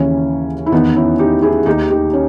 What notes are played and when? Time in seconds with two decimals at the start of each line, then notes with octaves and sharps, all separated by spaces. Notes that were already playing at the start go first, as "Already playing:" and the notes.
Already playing: D#2 C#3 E3 C#4
0.66 E4
0.72 E2 D#3 B3 D#4
0.95 C#4 E4
1.19 D#4 G4
1.42 E4 G#4
1.66 D#2 D#3 D#4 G4
1.90 D#4 G4
2.13 C#4